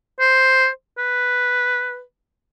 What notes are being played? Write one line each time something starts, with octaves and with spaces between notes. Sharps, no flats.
C5
B4